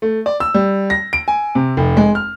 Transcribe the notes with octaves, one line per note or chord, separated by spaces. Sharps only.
A3
D5
E6
G3
A#6
D7
G#5
C3
F1
G#3
F6